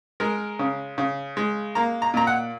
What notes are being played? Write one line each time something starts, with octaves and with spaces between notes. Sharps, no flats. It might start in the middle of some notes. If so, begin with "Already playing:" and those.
G#3 A#4
C#3
C#3
G#3
A#3 A#5
A#5
A#2 A#5
F#5